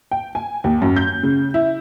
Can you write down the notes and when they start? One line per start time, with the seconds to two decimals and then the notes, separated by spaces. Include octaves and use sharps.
0.11 G5
0.35 G#5
0.64 D#2
0.82 F#2
0.96 G6
1.23 C#3
1.54 E4